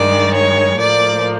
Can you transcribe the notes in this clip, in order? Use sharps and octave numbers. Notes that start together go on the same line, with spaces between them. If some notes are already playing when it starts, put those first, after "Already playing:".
Already playing: G2 D#3 G#3 D5
C#5
A2 F3 A#3 D5